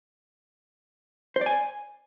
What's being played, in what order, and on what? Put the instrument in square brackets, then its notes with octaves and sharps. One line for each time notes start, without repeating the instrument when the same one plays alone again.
[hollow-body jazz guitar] C5
D5
G#5